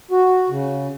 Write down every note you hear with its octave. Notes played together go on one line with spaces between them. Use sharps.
F#4
C#3